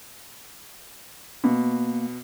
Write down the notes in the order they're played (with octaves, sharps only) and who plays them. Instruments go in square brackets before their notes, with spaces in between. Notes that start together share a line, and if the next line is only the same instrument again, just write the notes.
[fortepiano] B2 [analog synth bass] A#3